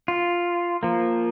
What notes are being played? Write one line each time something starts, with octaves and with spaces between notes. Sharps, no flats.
F4
F3 A#3